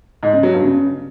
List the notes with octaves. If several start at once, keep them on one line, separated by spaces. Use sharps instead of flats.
G#2
C#3
F#3
G2
C#3